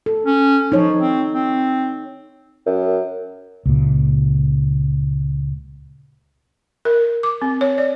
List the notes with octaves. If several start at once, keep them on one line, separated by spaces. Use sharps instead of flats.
A4
C#4
F3 D#4 C#5
C4
C4
F#2
C#2 A#2
A#4
D6
C4
C#5
D5